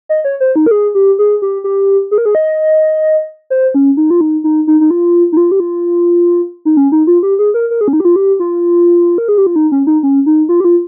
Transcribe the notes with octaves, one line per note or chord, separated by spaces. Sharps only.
D#5
C#5
C5
D#4
A#4
G#4
G4
G#4
G4
G4
G#4
A#4
G#4
D#5
C5
C#4
D#4
F4
D#4
D#4
D#4
D#4
F4
D#4
F4
G4
F4
D#4
C#4
D#4
F4
G4
G#4
A#4
A#4
G#4
C#4
D#4
G4
F4
G4
F4
A#4
G#4
G4
F4
D#4
C#4
D#4
C#4
D#4
F4
G4
F4